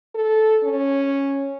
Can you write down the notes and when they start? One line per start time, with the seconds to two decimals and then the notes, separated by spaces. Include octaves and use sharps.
0.15 A4
0.63 C#4